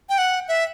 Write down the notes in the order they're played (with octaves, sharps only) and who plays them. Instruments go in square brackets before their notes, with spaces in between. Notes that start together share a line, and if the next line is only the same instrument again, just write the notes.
[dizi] G5
F#5
E5